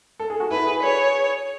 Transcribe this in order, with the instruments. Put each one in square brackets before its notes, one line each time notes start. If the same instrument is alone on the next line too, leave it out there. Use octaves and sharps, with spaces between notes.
[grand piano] A4
G#4
F#4
[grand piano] E4 [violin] B4
[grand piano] G#4
[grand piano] G#4 [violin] C#5